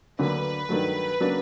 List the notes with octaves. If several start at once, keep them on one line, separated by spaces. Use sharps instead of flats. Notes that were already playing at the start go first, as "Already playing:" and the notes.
D2 D3 F#3 A#3 B4
G2 D#3 F#3 A3
C#3 F#3 A#3 D4